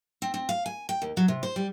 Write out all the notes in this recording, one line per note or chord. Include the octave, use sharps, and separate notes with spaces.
C4
C4
F5
G#5
G5
D#2
F#3
C3
C5
G3